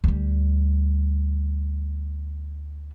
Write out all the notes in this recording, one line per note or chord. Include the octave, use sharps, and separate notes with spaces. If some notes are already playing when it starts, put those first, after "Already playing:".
D2 G3